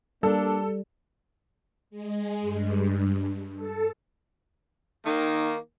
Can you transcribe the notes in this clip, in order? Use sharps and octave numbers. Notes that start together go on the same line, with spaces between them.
G3 A#3 D4 A4
G#3
G2
A4
D#3 A#3